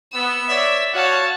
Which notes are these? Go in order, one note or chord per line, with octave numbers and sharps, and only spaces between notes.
B3 E6
C#5 D5 E5
F#4 C#5 F5 F#5 A5